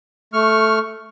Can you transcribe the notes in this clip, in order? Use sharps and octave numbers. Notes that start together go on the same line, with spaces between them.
A3 C#6 F6